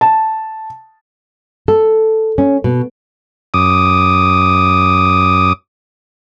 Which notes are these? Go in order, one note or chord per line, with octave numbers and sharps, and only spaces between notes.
A5
A4
C#4
B2
F#2 D6 D#6